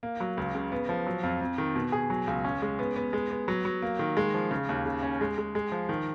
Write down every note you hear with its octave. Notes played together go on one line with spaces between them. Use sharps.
A#3
F#3
C#2
C#3
B3
F3
F#3
F2
F2
D#3
B2
G#4
F#3
C#2
C#4
G#3
B3
B3
G#3
B3
F#3
F#3
A#3
D#3
G#3
F3
C#3
D#2
C#3
C#4
G#3
G#3
G#3
F3
D#3